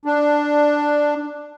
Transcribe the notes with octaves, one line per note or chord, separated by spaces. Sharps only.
D4